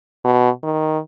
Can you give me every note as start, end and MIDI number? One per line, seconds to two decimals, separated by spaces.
0.25 0.50 47
0.63 0.99 51